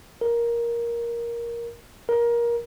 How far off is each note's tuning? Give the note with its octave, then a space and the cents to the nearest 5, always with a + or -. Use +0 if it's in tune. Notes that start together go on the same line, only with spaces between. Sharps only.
A#4 +10
A#4 +20